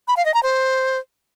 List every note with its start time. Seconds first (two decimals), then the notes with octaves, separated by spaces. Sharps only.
0.08 B5
0.17 F5
0.25 D#5
0.34 A#5
0.43 C5